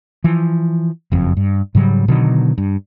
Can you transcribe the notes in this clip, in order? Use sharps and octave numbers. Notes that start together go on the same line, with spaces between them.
E3 F3
F#1 F2
G2
G#2 C#3 F#3 G3
B2 D3 D#3 F#3
G2